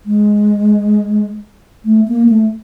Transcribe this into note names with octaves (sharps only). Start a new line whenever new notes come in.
G#3
A3
A#3
A3